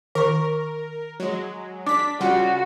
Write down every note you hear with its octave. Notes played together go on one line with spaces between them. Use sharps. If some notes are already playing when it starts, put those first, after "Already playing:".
D#3 A#4 C#6
F#3 G#3
D4 D6 B6
C#3 G3 F4 F#4